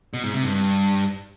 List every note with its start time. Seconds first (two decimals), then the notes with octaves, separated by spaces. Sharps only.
0.14 B2
0.24 G#2
0.34 C3
0.44 G2
0.54 G2